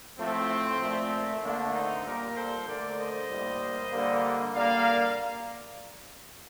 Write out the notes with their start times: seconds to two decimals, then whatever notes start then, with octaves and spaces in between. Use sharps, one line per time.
0.19 A2 F3 A3 C4
0.81 A#2 F3 A3
1.43 D3 A3 A#3 D4
1.74 C4 D#4
2.05 A#2 G3 A#3 G4 A#4
2.36 A4 C5
2.67 D3 A3 A#4 D5
2.98 C5 D#5
3.29 A2 G3 A#3
3.92 D3 G3 A#3
4.54 D3 G3 A#3 D5 F5